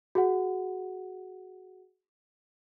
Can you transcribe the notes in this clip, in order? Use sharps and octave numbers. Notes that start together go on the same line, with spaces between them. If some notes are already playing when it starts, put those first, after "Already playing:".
F#4 G#4 F#5